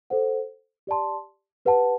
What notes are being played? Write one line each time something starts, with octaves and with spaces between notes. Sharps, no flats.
A4 C5 F#5
G4 D5 A5 C6
G4 B4 F#5 A5